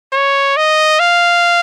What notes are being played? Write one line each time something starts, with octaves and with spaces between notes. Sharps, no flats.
C#5
D#5
F5